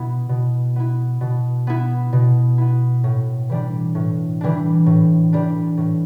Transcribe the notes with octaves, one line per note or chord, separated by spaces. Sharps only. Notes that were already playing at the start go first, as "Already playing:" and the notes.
Already playing: B2 B3 E4
B2
B3 E4
B2
B3 E4
B2
B3 E4
A2
E3 G3 D4
A2
E3 G3 D4
A2
E3 G3 D4
A2